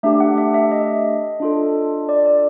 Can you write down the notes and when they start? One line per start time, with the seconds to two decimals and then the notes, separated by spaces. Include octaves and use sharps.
0.03 A3 D4 G4 E5
0.20 F#5
0.38 E5
0.54 E5
0.72 D#5
1.40 D4 F4 A4
2.09 D5
2.26 D5